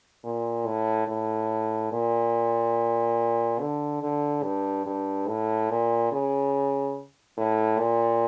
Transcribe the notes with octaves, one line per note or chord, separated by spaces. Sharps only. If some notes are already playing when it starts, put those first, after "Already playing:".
A#2
A2
A2
A#2
D3
D3
G2
G2
A2
A#2
C#3
A2
A#2